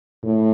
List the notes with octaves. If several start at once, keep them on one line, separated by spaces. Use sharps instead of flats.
A2